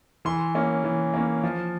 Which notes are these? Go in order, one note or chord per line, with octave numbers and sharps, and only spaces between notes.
E3 C6
A#3 C#4
E3
A#3 C#4
F3